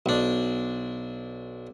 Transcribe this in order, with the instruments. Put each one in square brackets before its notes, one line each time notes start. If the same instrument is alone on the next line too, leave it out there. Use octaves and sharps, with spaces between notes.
[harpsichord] B1 D4